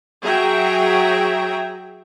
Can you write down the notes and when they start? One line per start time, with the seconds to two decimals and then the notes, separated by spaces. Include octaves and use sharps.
0.22 F#3 G#4 E5 G5 A#5